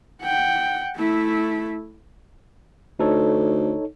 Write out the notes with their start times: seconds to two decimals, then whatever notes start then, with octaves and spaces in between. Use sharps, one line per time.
0.23 F#5 G5
0.96 A3 E4
2.99 D2 D#4 A4 C#5